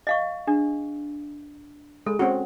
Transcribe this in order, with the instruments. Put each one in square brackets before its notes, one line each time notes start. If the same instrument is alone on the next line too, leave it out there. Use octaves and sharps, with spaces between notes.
[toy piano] D#5 F5 C#6
[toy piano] D4 [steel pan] G#4
[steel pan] G#3 [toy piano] A4
[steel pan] C4 C#4 F#4